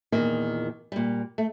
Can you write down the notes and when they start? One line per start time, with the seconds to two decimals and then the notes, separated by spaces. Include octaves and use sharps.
0.12 E2 A#2 D#3
0.92 A#2 G3
1.38 A3